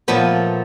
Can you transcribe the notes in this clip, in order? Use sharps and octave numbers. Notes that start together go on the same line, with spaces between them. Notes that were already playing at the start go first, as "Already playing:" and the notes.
A#2 F3 A3 B3